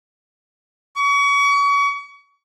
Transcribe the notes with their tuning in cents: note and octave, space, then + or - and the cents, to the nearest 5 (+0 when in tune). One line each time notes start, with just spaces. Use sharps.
C#6 +35